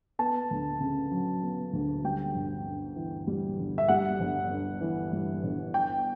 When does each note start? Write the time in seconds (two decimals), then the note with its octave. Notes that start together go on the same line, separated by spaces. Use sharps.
0.19 B3 A5
0.51 D2
0.80 C#3
1.11 F#3
1.43 B3
1.73 D2
2.04 G3 G5
2.35 G1
2.66 G2
2.96 E3
3.27 G3
3.59 G1
3.78 E5
3.88 G3 F#5
4.20 G1
4.50 G2
4.81 E3
5.13 G3
5.43 G1
5.74 B3 G5